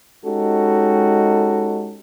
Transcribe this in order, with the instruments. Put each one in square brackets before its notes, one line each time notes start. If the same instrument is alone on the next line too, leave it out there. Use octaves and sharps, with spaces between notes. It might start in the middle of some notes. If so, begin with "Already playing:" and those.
[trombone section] G#3 C#4 D#4 F#4 G4 A4